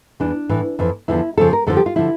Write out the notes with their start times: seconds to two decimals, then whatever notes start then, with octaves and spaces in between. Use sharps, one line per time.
0.20 E2 E3 D4
0.49 A2 E3
0.79 F2 E3
1.08 E2 D3 F3 E4
1.37 F2 C#3 F3 A4
1.53 A#4
1.67 F2 D3 F3 A4
1.77 G4
1.86 F4
1.96 D3 F3 E4